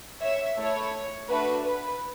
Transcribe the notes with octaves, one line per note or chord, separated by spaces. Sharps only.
C#5 E5
A3 E4 A4 C#5
A3 D4 F#4 B4
B4